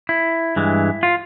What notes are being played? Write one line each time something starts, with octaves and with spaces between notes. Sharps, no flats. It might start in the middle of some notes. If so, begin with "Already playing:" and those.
E4
G2 E3 G#3
F4